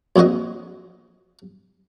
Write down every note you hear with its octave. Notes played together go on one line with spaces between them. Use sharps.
A#1 F2 A#2 F#4 D#5